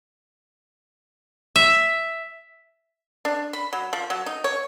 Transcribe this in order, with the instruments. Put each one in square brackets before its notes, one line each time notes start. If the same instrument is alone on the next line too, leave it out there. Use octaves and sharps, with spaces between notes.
[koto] E5
[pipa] D4
B5
F#3
F3
F#3
D#4
C#5